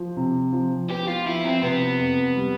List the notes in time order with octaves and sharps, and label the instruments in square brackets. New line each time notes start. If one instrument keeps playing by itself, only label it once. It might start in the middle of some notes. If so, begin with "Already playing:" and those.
Already playing: [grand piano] F3
C3
F3
[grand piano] B3 [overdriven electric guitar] G4
[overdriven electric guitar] F4
[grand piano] F3 [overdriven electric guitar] E4
[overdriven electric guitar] C4
[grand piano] C3 [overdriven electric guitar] B3
[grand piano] F2
G3